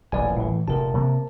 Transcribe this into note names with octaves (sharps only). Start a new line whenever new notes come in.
D#1 A1 E2 D5 G#5
A2 E3
F1 A#2 A#4 A5
C3 A#3